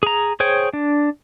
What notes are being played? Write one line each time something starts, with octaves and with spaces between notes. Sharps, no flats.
G#4 A#5
G#4 C5 C#5 G5
D4